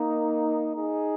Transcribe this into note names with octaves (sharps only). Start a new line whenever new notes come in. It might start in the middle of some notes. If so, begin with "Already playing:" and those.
Already playing: A#3 D#4
D#4 G#4